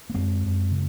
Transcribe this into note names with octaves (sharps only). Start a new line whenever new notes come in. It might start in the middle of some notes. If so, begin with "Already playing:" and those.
A#3
F#2 G#3 C4
F#2
C#3